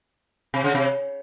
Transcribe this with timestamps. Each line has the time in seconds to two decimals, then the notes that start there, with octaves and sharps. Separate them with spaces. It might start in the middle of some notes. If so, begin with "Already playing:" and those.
0.54 C3
0.64 C#3
0.75 C3